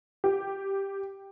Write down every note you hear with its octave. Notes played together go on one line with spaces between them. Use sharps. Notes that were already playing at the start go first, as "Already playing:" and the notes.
G4